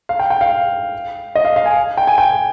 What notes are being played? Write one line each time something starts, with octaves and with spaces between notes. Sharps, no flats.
F5
G5
G5
F5
D#5
F5
F5
G#5
G5
G#5
G5